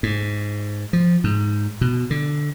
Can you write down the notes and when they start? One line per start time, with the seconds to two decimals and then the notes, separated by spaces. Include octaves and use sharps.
0.03 G#2
0.93 F3
1.24 G#2
1.81 B2
2.10 D3